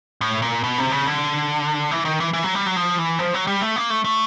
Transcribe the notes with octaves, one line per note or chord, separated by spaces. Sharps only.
A2
A#2
B2
C3
C#3
D3
E3
D#3
E3
E3
F#3
G3
F#3
F3
E3
F3
F#3
G3
A3
A#3
A3
A3